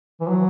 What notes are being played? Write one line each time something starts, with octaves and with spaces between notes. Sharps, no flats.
E3
F#3